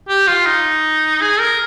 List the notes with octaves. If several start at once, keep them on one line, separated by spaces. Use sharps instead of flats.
G4
F4
D#4
G#4
A#4